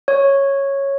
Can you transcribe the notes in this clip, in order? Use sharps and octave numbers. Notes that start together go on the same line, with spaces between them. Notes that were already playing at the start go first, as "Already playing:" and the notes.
C#5